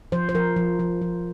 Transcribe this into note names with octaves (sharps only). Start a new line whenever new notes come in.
F3 C5
C5
F3 A#4
F3
F3
F3